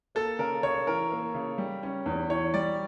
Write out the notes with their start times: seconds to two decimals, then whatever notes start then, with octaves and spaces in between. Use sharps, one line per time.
0.15 A#3 A4
0.39 C#3 A#4
0.63 C#3 C#5
0.87 E3 A#4
1.11 A#3
1.34 C#3
1.58 G3
1.83 C#4
2.06 E2
2.30 E3 C#5
2.54 G3 D5